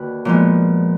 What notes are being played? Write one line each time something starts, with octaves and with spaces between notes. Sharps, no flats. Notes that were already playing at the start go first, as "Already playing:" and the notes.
Already playing: D#2 D3 F#4 B4
A#2 F3 G#3 B3